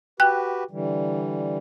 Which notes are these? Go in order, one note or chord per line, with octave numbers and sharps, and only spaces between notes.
F#4 G4 B4 G5 F#6
D3 E3 G3